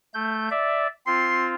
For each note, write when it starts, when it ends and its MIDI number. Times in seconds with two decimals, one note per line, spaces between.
0.14 0.49 57
0.14 0.49 91
0.51 0.87 74
0.51 0.87 76
1.07 1.55 60
1.07 1.55 65
1.07 1.48 84